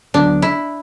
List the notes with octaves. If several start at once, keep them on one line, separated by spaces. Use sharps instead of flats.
D2 D3 F#3 B3 D4
E4